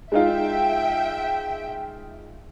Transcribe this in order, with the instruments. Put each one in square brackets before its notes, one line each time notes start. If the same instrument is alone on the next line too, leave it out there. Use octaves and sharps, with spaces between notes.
[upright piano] G#3 D#4 F4 [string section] E5 G5